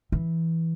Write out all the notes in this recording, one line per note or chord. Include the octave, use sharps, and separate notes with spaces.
E3